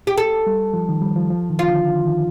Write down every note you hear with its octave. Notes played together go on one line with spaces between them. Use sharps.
G4
A4
G3
F3
D#3
G3
F3
F3
D#3
F4
D3
D3
D#3